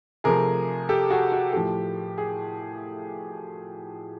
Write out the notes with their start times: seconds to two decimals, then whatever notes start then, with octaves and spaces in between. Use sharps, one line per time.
0.24 C3 F3 A3 G#4 A#4
0.89 G4 A4
1.10 F#4 G#4
1.32 F#4
1.53 A2 F3 A3 G4
2.18 G#4